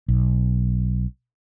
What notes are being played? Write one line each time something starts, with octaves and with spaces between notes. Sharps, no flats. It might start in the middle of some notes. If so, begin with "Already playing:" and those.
B1